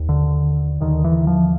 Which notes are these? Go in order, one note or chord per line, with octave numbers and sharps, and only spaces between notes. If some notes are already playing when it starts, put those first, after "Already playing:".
Already playing: D#2
D3
D#2 D3 D#3
E3
F3